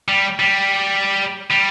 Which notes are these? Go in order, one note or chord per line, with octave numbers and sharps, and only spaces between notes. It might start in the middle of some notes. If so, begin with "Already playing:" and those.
G3
G3
G3